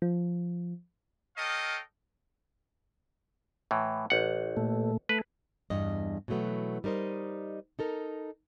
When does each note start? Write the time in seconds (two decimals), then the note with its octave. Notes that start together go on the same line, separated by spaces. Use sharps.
0.02 F3
1.37 A4 A#4 C#5 D#5 F5 G5
3.71 A2 E3
4.10 A1 F#5
4.57 A#2 A3
5.09 A3 B4
5.70 E2 G2 D#5
6.28 B2 E3 F#3 A3 B3
6.84 G3 D#4 A#4 C5 D#5
7.79 D#4 A4 A#4